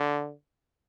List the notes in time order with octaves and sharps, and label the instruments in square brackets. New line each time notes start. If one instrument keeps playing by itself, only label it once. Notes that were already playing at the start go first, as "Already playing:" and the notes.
Already playing: [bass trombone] D3